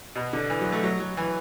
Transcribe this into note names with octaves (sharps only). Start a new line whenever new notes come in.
B2
D3
E3
F#3
A3
F#3
F#3
E3